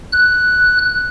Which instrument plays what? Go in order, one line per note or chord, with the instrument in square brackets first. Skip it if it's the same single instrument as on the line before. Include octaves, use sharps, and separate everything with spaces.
[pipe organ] F#6